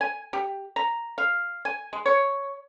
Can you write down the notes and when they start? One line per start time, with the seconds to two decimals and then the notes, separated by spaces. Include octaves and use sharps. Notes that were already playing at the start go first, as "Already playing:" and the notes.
0.01 G#5
0.33 G4
0.76 A#5
1.18 F5
1.65 G#5
1.93 G#3
2.06 C#5